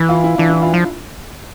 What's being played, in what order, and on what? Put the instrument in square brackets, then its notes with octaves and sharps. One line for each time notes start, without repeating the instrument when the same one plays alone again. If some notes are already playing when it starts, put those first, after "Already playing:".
Already playing: [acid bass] E3 [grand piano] E4
[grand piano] F4
E4
[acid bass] E3 [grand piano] D4
[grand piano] E4
F4
[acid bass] F3 [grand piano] F4